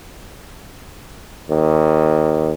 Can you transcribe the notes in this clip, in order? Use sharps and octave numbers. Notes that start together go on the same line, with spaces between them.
D#2